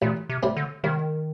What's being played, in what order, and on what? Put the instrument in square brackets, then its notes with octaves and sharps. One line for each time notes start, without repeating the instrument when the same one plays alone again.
[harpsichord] A1 [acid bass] A#2
[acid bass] C3
[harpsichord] A2 G3 C4
[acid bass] D3
[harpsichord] C2 [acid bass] D#3